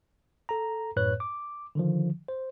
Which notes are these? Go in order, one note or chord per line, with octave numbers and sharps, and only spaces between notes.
A4 A#5
F#2 A2 B4 C#5 F#6
D6
D3 D#3 F3
C5